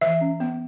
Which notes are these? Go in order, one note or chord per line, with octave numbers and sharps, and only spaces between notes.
E3 E5
C#4
B3